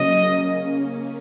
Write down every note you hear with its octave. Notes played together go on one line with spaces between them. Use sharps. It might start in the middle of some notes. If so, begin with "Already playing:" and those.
Already playing: C#3 F#3 A#3 C#4 D#5
C#3 A#3 C#4